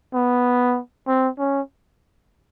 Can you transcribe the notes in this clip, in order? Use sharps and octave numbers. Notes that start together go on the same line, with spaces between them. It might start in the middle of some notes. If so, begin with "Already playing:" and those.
B3
C4
C#4